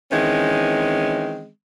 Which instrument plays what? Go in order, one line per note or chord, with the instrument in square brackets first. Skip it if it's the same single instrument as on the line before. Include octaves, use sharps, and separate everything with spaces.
[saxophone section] D#3 E3 G#3 C4 C#4